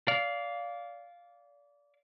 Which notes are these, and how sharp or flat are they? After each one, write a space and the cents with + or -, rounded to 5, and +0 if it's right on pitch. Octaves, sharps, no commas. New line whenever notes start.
D5 -25 F5 +0